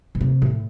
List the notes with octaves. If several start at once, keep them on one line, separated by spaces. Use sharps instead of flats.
B2
C3
A2